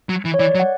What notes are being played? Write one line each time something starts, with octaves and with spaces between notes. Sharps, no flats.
F#3
E3
C#5
E3 D5
F#3
F#5